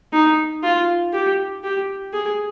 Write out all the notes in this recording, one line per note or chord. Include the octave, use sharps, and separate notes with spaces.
D#4
F4
G4
G4
G#4